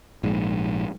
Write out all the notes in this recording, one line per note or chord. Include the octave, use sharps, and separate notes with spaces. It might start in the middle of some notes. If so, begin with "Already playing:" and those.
A#1 G#2